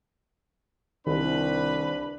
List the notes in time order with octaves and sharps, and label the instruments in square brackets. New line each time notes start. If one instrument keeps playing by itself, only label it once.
[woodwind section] C2 [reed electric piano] D#3 [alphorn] D4 [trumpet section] B4 B5